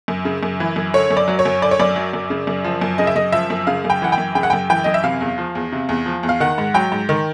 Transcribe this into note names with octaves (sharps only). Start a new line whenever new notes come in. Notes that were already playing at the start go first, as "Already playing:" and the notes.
F#2
C#3
F#2
E3
F#2
D3 C#5
F#2
D5
F#3
C#5
F#2
D3 D5
C#5
F#2 D5
F#3
F#2
C#3
F#2
F3
F#2
C#3 D#5
E5
F#2 D#5
F3 E5
F#2
C#3 F5
F#2
G5
E3 F#5
G5
F#2
C#3 G5
F#5
F#2 G5
E3 G5
F#2 D#5
E5
C3 F5
E2
F3
E2
C3
E2
F3
E2
F5
D#3 F#5
G#2
F#3 G5
G#2
D#3